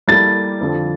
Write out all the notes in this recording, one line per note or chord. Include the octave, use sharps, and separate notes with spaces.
G3 A#3 E4 A4 D5 A6
F2 D3 F3